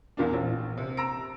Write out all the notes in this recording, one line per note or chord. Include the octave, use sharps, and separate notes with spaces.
E2 A#2 A#3 D4
A#1
C3
A#5 E6 A#6 D7